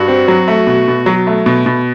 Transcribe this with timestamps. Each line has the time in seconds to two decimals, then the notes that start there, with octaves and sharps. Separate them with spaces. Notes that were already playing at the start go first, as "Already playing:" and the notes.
Already playing: G2 F#4
0.08 C4
0.28 F#3
0.48 A3
0.67 B2
0.88 B2
1.06 F#3
1.27 A3
1.46 B2
1.66 B2